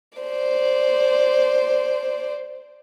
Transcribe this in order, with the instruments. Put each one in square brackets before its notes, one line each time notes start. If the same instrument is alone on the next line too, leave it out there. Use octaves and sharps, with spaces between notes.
[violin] C5 D5